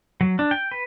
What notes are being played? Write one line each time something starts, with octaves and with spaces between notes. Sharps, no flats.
F#3
D4
G5
B4